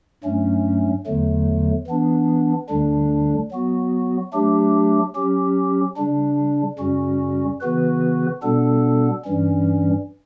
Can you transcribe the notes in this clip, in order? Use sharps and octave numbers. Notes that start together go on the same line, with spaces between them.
G2 F#3 A3 C#4
E2 D3 F#3 A3
E3 B3 D4
D2 D3 G3 D4
F#3 B3 F#4
F#3 A3 D4 G4
F#3 C#4 G4
C#3 G3 D4
F#2 C#3 G3 C#4 F#4
C#3 E3 B3 F#4 B4
B2 G3 B3 D4 A4
G2 E3 G3 C#4